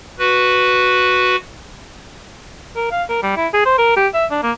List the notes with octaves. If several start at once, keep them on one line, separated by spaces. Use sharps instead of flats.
F#4 B4
A#4
F5
A#4
G3
E4
G#4
C5
A#4
G4
E5
D4
A#3